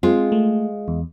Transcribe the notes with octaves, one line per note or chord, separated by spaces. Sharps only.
G#3 C4 F4
A3
E2